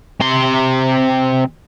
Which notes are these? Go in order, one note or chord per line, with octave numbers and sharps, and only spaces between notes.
C3 C6